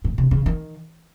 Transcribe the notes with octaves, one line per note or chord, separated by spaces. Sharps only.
A2
C3
C#3
D#3